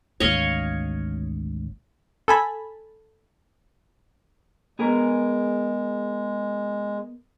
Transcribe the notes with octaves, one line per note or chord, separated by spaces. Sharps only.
G#1 D2 C#5 D#5 F5
A4 G#5 B5
G#3 B3 G#4 A#4